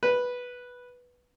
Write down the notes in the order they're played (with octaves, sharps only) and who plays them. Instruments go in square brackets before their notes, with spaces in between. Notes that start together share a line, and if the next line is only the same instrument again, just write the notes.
[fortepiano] B4